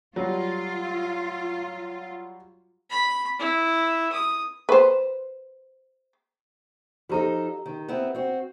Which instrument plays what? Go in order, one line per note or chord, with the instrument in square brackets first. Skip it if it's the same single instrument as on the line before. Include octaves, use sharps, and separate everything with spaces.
[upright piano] F#3 G3 [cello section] F4
[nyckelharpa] B5
E4
D#6
[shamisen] B4 C5
[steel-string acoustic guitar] F3 D#4 A4 [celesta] F#4 G4 A#5
[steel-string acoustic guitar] D#3
B3 C4 E4
C4 F#4